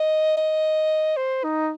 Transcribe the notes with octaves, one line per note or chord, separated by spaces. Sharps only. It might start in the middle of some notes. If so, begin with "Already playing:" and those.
Already playing: D#5
D#5
C5
D#4